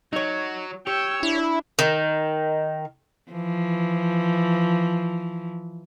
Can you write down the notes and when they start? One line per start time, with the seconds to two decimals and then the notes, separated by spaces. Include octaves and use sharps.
0.13 F#3 D#4 C#5
0.87 G4 C#5 G5 E6
1.23 D4 E4
1.79 D#3
3.32 E3 F3